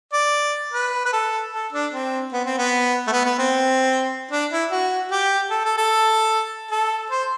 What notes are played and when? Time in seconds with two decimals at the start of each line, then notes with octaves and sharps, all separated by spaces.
0.13 D5
0.73 B4
1.05 B4
1.13 A4
1.53 A4
1.73 D4
1.93 C4
2.33 B3
2.46 C4
2.58 B3
3.07 A3
3.12 B3
3.26 B3
3.39 C4
4.32 D4
4.51 E4
4.71 F#4
5.11 G4
5.51 A4
5.65 A4
5.78 A4
6.71 A4
7.10 C5